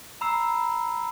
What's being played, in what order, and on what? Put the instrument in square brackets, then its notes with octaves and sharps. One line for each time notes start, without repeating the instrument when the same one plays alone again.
[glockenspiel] A#5 B5 E6 C7